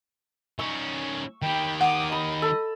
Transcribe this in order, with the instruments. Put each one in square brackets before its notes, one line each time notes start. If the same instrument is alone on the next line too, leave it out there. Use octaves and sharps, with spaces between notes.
[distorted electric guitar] D#3 C#4 [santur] C#6 E6
[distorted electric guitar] D#3 G4 [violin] G5 B5
[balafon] F#5 [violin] D6 D#6
[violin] D#5 [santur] B5
[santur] A4